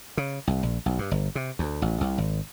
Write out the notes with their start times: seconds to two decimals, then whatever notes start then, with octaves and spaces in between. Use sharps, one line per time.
0.17 C#3
0.47 C2
0.63 A#1
0.86 B1
0.99 G2
1.11 G1
1.35 C3
1.59 D2
1.82 A1
2.01 C2
2.18 G#1